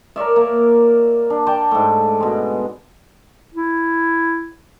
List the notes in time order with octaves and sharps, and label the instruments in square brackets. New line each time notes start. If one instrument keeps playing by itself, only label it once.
[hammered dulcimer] A#4 C#5 D5 E5
A#3
D4
D5 G5 A5 D6
G#2 A3
B2 G#3
[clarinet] E4